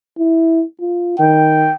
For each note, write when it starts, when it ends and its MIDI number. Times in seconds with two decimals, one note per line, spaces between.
0.18 0.64 64
0.81 1.16 65
1.19 1.70 51
1.19 1.75 79